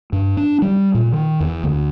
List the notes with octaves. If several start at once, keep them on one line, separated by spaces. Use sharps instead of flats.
G2
D4
G3
A#2
D#3
E2
D2